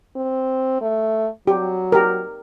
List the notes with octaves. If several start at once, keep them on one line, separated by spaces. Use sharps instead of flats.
C4
A3
F#3 G4
G4 A#4